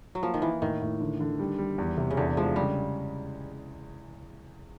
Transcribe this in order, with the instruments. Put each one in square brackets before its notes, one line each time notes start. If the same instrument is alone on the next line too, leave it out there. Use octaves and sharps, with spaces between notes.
[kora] F#3
[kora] F3 [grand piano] A#3
[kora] D#3
[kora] E3 [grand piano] A#3
[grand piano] A2 [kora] D#3
[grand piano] A2
D3
D3
G3
G3
E2
C3
[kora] C#3
[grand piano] E2 [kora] D3
[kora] F3 [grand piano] G#3
[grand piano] C#3 [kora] G3